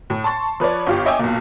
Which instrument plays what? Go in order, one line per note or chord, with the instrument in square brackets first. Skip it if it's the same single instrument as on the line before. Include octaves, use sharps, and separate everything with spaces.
[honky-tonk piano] A2
A5 C6 C#6 A6
F3 B4 C#5 D5
G1 F4 G4
C#5 D#5 E5 G5 G#5 D6
B1 A#2